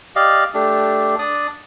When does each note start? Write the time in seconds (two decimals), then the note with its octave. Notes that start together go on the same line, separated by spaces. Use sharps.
0.16 G4 D5 D#5 F5
0.54 A3 D4 G4
1.19 D4 D5 D#6